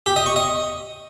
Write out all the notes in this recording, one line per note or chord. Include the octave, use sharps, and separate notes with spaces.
G4
D#5
C#6
D#5